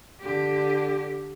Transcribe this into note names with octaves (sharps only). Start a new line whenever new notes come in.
D3 G4